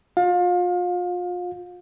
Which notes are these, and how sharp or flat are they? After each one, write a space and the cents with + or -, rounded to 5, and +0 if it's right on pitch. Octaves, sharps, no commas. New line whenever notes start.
F4 +35 F5 +30